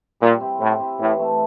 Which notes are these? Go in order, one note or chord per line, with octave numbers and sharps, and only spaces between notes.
A#2 G3
C4 E4 G4
A2 G3
C4 E4 G4
A2 E3
A3 C4